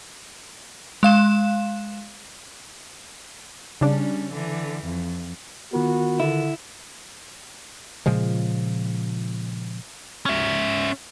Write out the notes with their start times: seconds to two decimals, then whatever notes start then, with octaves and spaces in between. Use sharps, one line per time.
1.03 G#3 F5 E7
3.81 C#3 G3 C#4 D4
4.33 D3 E3
4.84 F2
5.73 D#3 B3 F4 F#4 A#4
6.20 D3 E4
8.06 A#2 C#3 F3 G#3
10.26 C#4 E5